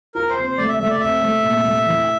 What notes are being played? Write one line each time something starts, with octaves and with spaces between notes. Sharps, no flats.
F4 A#4
C5
C4
C5
A3 D5
E5
A3 E5
D5
C4 E5
A3
A#2
A3
E3